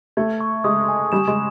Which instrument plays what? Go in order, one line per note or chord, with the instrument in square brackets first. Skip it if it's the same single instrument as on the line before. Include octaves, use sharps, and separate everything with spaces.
[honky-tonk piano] A3 [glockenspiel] G#6
[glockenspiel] C#6
[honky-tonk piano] G#3 [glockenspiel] D#6
[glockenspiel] G#5
[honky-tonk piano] G3 [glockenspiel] E7
[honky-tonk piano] G#3